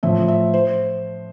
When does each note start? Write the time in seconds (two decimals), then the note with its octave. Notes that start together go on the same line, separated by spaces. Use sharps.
0.03 A2 F3 E5
0.28 E5
0.54 C5